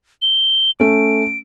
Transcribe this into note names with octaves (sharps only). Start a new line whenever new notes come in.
G7
A3 C#4 D7